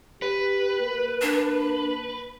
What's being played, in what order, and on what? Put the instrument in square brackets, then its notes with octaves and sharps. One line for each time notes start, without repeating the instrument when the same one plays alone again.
[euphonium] G4 [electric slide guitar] B4
[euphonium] A#3
[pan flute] D4